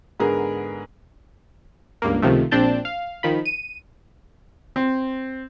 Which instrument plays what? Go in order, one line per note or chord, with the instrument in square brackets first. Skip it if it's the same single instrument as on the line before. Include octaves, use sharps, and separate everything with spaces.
[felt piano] G#2 D3 B3 G#4 A#4
[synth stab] C#2 G2 A#3
C#2 C3 D#3 F3 A3
A#1 C4 D4 A5 G6
F5
D#3 F3 B5
D#7
[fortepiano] C4